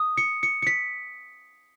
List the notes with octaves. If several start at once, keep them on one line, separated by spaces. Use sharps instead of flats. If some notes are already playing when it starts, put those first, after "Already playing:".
Already playing: D#6
C#7
C#7
C#7
B6